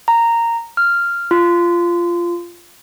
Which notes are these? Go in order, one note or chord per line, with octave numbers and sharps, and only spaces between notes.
A#5
F6
F4